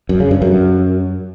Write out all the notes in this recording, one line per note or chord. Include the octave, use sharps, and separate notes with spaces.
F#2
C#3
G2
F#2